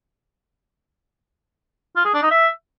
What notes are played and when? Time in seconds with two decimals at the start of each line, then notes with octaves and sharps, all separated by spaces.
1.96 F4
2.05 G#4
2.13 D4
2.22 D#4
2.31 E5